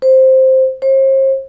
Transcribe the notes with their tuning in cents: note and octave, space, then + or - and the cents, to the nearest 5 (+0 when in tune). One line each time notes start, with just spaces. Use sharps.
C5 +5
C5 +40